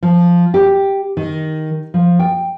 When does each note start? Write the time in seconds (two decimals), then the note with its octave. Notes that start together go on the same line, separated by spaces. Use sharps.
0.03 F3
0.54 G4
1.17 D#3
1.94 F3
2.19 G5